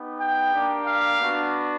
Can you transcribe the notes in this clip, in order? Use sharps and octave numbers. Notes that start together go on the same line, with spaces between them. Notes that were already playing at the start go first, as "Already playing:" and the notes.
Already playing: B3 D#4 G4
G5
A#3 D4 G4
F5
B3 D4 F#4